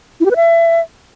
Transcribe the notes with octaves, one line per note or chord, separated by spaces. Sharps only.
E4
G4
B4
E5